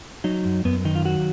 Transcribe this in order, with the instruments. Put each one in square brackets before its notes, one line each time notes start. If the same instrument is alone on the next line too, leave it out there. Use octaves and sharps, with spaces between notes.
[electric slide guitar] F#3 D#4
F#2
F#2 B3
D#3 D#4
F4
F#3 F#4